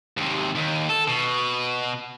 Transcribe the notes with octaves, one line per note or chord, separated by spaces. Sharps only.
D#2 C3
D#2
A4
B2